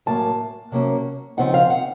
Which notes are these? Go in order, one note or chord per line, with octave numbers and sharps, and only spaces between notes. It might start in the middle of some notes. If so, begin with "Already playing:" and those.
A2 F#3 A#3 A5
C3 F#3 A#3 C#4
C#3 F3 C4 D#4 F#5
F5
F#5